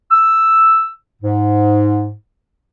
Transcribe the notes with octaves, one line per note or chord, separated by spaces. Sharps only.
E6
G#2